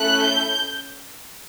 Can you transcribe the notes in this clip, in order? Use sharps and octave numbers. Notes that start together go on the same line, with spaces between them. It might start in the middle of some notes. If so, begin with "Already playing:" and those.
Already playing: A3 C#4 E4 A4 F#6
G6